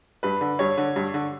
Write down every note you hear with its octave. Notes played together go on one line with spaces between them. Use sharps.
G2 B4
D3
G2 C#5
D3
G2
D3